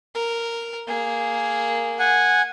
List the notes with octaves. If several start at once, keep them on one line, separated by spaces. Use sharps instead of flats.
A#4
A#3 G#4
F#5 G#5